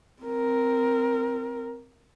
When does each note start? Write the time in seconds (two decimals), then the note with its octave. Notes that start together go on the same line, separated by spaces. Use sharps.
0.23 C4 A#4